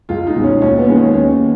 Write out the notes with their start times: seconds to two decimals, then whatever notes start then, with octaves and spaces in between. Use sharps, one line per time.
0.09 C#2 F4
0.27 D#4
0.36 B2 G#3
0.43 C#4
0.62 D#2 C#4
0.79 B3
0.89 D#3 G#3
0.97 C#4
1.14 D#2 C#4